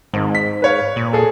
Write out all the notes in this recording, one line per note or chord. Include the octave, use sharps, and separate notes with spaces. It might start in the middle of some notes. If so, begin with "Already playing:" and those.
G#1 G#2
B6
B4 C#5 F5
A#2
G#4 A4